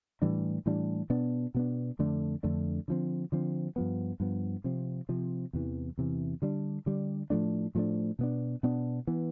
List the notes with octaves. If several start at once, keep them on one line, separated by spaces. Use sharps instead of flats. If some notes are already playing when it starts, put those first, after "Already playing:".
A2 E3 G3 D4
A2 E3 G3 D4
B2 B3 D4
B2 B3 D4
F2 D3 A3 D4
F2 D3 A3 D4
D3 F3 C4
D3 F3 C4
G2 F3 B3
G2 F3 B3
C3 F3 C4
C3 F3 C4
E2 C3 E3
E2 C3 E3
D3 G3 D4
D3 G3 D4
A2 F3 A3 D4
A2 F3 A3 D4
B2 B3 D4
B2 B3 D4
E3 B3